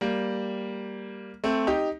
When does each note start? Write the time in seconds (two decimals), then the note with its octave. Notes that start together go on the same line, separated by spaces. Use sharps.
0.01 G3 A#3
1.44 A3 C4
1.67 D#4 G4